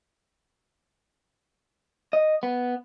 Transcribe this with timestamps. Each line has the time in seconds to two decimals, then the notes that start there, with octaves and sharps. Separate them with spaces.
2.13 D#5
2.43 B3